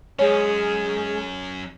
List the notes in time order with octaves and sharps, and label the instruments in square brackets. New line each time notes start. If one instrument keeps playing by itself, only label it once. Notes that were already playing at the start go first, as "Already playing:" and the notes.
[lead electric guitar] F#2 C#4 [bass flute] G#3 [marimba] C#5